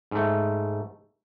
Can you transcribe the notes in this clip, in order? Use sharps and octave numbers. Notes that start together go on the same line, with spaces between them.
G#2 A3